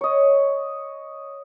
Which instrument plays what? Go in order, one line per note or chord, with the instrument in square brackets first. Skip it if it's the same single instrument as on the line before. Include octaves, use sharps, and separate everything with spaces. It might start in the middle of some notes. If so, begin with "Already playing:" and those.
[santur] C#5 D#5